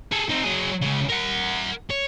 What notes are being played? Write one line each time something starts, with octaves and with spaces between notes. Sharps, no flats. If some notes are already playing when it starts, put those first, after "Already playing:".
G#4 A4
C4 D#4
F#3 G#4
C#2 C#3
A#4 F#5
C#5